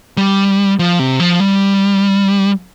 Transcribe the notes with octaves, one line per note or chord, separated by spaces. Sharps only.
G3
F3
C3
F3
G3